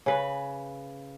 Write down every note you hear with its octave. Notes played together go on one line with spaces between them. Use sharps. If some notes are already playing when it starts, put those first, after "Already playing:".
C#3 B4